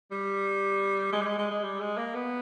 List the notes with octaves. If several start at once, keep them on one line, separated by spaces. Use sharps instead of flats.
G3
G#3
G3
G#3
G#3
G#3
G3
G#3
A#3
B3